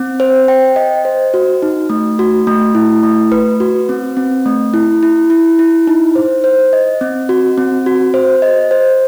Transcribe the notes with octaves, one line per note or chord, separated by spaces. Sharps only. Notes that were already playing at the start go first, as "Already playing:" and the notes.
Already playing: C4
C5
G5
D#5
C5
F#4
D#4
A3
F#4
A3
E4
A3
B4
F#4
C4
C4
A3
E4
E4
E4
E4
D#4
C5
C5
D#5
C4
F#4
C4
F#4
C5
D#5
C5